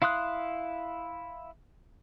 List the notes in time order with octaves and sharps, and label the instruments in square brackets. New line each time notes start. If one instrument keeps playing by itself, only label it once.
[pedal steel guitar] E4 F5 C6 D#6 F#6